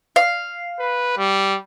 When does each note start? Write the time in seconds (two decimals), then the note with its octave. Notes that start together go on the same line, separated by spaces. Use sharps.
0.16 F5
0.79 B4
1.17 G3